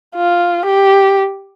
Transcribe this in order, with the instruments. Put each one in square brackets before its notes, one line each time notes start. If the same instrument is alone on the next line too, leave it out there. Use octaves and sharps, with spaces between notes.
[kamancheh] F4
G4